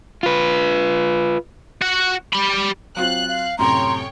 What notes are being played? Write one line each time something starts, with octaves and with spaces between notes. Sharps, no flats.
F4 B4
F#4 F#5
G4 B5
F#3 C4 F4 F5 F#6
F5
F#2 A2 C3 C#5 G5 A#5 C6